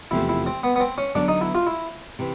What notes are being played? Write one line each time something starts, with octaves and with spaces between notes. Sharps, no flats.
E2 C3 F3 A3 E4
E4
C4
B3
B3
C4
C#4
D3 F#3 B3 D4
D#4
E4
F4
E4
C3 E3